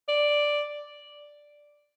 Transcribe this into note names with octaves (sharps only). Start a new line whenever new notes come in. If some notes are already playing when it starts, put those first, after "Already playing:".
D5